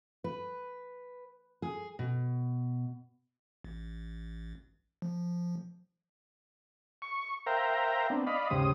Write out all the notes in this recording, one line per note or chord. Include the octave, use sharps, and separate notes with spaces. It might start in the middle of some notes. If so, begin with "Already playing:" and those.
B4
G#4
B2
A1
F3
C#6
A#4 C5 E5 F5 G5 A#5
B3 C4 D4
D5 D#5 F5 B5
D#2 G#2 C#3 G4 C5 D#6